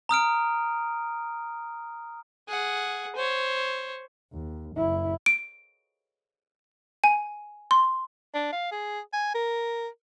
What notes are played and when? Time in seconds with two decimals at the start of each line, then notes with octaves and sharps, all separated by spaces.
0.09 A#5 D#6 F6 D7
2.48 G#4 F#5
3.16 C5 C#5
4.32 D#2
4.77 F#1 E4
5.26 D7
7.04 G#5
7.71 C6
8.34 D4
8.52 F5
8.71 G#4
9.13 G#5
9.34 A#4